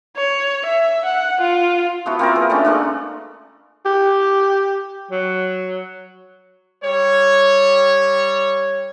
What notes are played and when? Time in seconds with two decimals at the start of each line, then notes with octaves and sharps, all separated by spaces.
0.17 C#5
0.66 E5
1.05 F#5
1.41 F4
2.06 F3 B3 E4 F#4
2.19 A#3 C4 F4 A#4
2.35 G#4 B4
2.50 A3 C#4 D4
2.65 G#3 A#3 D4
3.86 G4
5.11 F#3
6.83 G3 C#5